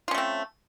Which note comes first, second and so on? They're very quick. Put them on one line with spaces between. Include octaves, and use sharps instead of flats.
F4 C#4 A3 C4